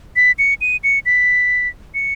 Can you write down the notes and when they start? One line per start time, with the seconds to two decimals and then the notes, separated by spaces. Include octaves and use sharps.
0.16 B6
0.39 C#7
0.61 D#7
0.84 C#7
1.06 B6
1.94 C#7